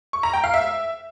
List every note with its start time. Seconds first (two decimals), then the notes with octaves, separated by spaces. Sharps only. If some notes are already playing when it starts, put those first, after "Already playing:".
0.13 C#6
0.23 A#5
0.33 G5
0.44 F5
0.54 E5